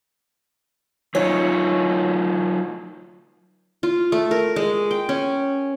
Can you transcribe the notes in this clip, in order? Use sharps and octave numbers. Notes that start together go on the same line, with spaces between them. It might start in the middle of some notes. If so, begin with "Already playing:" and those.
F#3 D#4 F4 C#5
F4
A3
A#4
G#3
G5
C#4